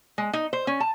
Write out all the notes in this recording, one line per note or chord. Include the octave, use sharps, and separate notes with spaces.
G#3
D#4
C5
C#4
A5